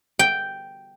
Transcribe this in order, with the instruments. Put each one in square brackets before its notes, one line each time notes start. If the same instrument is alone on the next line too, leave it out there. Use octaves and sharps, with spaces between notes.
[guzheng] G5